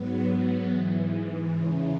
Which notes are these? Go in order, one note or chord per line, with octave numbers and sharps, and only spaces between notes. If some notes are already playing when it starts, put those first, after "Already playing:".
Already playing: G#2 F#3 B3
G#2 E3
E2 C#3 E3 C#4